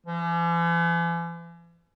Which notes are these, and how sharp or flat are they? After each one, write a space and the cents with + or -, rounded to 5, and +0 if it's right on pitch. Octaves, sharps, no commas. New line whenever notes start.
E3 +45